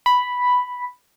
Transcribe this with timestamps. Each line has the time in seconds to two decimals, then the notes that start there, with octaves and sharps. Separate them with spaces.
0.06 B5